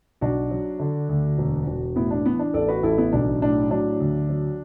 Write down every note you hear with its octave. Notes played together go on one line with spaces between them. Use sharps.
B1 D4 F#4
F#3
D3
D2
E1
E1
A2 B3 E4
D4
E3 B3
D4
A1 A4 D5
F#4 B4
A1 E4 A4
B3 E4
B1 D4
A2 D4
F#3 D4
D2
F#3